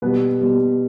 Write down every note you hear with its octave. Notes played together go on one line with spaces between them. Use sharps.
B2 G3 B3 B4
B2 G3